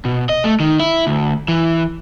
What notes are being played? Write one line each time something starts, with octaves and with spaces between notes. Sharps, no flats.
B2
D#5
A3
D#3
E4
D2
E3